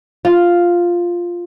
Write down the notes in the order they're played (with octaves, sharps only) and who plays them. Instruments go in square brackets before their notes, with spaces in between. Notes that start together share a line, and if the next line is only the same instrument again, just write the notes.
[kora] F4